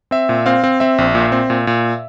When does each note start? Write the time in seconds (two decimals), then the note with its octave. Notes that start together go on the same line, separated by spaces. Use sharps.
0.11 C4 E5
0.29 A#2
0.46 C4 F5
0.64 C4
0.80 C4 E5
0.98 A#1
1.15 A#2
1.32 C4
1.50 A#2
1.67 A#2